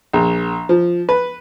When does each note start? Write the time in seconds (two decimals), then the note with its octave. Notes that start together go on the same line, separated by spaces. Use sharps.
0.13 A#1
0.69 F3
1.09 B4